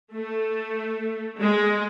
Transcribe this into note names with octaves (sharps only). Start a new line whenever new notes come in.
A3
G#3